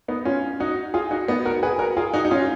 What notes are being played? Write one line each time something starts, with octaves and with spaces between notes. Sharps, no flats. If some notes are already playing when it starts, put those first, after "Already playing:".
B3 D#4
C#4 F4
D#4 F#4
F4 G#4
D#4 F#4
B3 D#4
F#4 A#4
G#4 B4
F#4 A#4
F4 G#4
D#4 F#4
D#4
C#4 F4